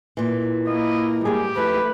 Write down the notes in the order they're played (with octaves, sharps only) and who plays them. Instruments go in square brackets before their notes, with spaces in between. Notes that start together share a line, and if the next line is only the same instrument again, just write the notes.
[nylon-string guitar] A#2 E3
[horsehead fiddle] A#3 [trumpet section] E4 D#5
[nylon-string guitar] G#2 A#3 G#4 [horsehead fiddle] G3 [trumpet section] G4
[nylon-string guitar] F2 E4 [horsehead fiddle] A3 B4